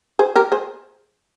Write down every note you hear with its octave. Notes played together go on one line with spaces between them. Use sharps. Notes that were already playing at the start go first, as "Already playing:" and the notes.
G#4 C5
G4 A#4
G#4 C5